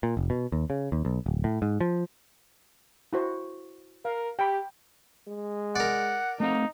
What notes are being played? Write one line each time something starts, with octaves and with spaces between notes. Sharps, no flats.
A#2
F1
B2
D#2
C#3
D#2
B1
D1
A2
G#2
F3
E4 F#4 C5
A#4 F5
G4 G5 B5
G#3
A#4 D5 F#5
A3 C4 D#4 F5